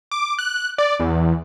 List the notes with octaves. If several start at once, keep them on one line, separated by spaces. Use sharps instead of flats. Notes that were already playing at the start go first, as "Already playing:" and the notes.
D6
F#6
D5
E2